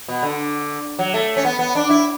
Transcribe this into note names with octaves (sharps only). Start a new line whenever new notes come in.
B2
D3
F#3
A3
C#4
B3
B3
D4
E4